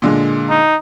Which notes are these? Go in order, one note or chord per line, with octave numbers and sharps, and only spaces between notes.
A#2 D3 G#3
D#4